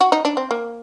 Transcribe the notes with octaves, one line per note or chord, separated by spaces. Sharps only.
F#4
D#4
D4
C4
A#3